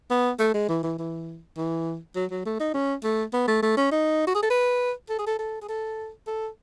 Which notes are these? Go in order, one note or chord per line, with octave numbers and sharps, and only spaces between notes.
B3
A3
G#3
E3
E3
E3
E3
F#3
F#3
A3
D#4
C#4
A3
B3
A3
A3
C#4
D#4
F#4
G#4
A4
B4
A4
G#4
A4
A4
G#4
A4
A4